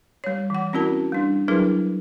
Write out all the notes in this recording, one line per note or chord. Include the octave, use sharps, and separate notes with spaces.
G3 C#5
E3 F#5
C4 C#4 E4 F#4 A#4 A5
G3 D4
F#3 D4 E4 G#4 A#4 B4